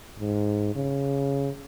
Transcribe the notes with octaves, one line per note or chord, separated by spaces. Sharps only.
G#2
C#3